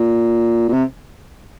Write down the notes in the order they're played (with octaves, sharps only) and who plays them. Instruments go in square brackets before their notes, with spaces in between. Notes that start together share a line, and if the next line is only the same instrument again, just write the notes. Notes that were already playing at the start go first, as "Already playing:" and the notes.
Already playing: [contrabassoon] A#2
A#2
C3